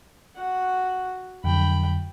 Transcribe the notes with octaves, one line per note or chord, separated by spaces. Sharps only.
F#4 F#5
F2 D3 F#3 G5 B5